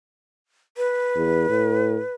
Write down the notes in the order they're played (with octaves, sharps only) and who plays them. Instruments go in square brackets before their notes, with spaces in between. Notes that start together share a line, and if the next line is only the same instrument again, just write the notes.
[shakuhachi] B4
[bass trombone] E2
A2